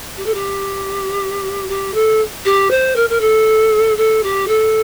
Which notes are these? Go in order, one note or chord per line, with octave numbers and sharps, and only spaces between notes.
G4
A4
G4
G4
A4
G4
C5
A#4
A#4
A4
A4
G4
A4